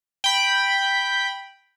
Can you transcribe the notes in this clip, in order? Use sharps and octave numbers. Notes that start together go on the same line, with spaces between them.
G5 B5